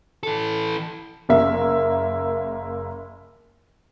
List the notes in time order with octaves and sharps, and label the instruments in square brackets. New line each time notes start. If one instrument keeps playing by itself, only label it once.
[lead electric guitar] E3 A4
[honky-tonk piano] F#1 A#3 E5